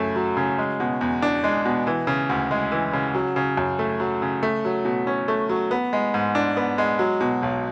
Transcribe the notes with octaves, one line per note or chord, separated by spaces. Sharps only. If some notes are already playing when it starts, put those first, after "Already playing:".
Already playing: F#2 C#3 A3
F#3
C#3
G#3
B2
E2
D4
G#3
B2
E3
C#3
D2
G#3
E3
C#3
F#3
C#3
F#2
A3
F#3
C#3
A3
F#3
B2
C#4
A3
F#3
B3
G#3
G#2
D4
B3
G#3
F#3
B2
B1